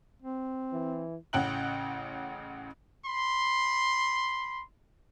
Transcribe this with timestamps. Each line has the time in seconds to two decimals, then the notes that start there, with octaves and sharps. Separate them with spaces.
0.22 C4
0.73 E3
1.33 A1 C#3 F#5 G5 F#6 F#7
3.06 B5 C6